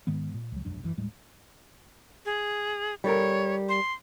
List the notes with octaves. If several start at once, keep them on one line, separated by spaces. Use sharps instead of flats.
G#2 D#3 G#3 B3
A#2
C#2 F#3
E1 B1 F#2 D4
G1 F#2 A#2 E3
D#1 A2 G3 G#3
G#4
G3 A4 A#4 C#5
C6